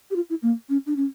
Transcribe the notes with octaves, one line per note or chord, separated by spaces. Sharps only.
G4
F4
E4
A#3
C#4
D4
C#4